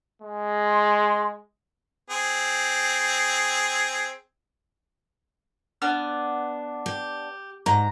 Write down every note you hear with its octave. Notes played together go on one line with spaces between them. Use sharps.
G#3
C6
C4 G#4
B3 D4 F6
G4
G#2 A#5